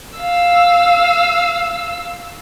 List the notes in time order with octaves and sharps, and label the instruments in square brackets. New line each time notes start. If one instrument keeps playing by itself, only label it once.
[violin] F5 E6